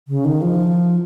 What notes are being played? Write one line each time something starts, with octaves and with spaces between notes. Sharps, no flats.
C#3
D#3
F3